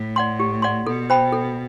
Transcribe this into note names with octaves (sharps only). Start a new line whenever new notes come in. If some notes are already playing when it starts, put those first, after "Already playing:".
Already playing: A2
D5 F#5 C6
G4
D5 F#5 C6
B2 A4
C5 G5 B5
A4